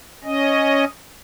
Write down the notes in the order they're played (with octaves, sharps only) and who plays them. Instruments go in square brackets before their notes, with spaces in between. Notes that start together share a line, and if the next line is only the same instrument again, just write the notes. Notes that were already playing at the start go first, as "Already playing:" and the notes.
[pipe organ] C#4 D#5